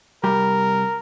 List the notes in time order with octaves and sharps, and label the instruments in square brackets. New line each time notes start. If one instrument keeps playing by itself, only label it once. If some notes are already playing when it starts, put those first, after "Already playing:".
[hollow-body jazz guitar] C2 G3 G4 [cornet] A#4